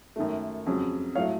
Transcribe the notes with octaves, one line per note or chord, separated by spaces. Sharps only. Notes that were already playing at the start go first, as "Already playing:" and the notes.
F#2 D#3 A3
F2 C#3 F#3
A2 F#3 A3 C#5 F5